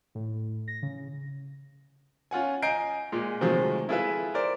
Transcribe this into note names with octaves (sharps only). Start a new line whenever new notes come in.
A2
A#6
C#3
C#4 F4 F#5 G#5
D#5 G#5 A#5 G6 C7 D7
A#2 G#3
C3 D#3 F3 F#3 G#3 A3
E4 F4 G#4 A4 B4 E5
A#4 C5 D5